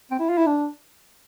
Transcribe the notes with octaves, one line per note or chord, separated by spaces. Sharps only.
C4
E4
F4
E4
D4